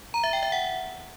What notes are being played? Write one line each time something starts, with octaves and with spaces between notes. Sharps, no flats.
A#5
E5
G5
E5
F#5